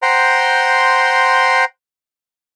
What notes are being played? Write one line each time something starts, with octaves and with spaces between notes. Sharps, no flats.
C5 F#5 G5 A#5 C6